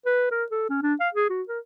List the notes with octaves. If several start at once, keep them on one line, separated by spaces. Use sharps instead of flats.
B4
A#4
A4
C#4
D4
F5
G#4
F#4
A#4